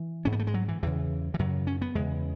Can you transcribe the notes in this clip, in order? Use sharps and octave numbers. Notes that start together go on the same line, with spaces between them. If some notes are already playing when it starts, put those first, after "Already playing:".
Already playing: E3
G#2 C#4
B3
A3
G#3
F#3
E3
E2 C#3 E3
E3
F#2 C#3 F#3
C#4
B3
E2 C#3 G#3